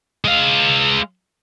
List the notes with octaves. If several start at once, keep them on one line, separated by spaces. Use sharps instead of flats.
G#3 F5